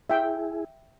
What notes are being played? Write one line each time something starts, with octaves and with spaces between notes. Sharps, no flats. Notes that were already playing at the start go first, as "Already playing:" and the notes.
E4 G#4 E5 G5